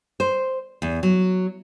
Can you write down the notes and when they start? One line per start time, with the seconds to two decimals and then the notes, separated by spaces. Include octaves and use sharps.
0.20 C5
0.82 E2
1.03 F#3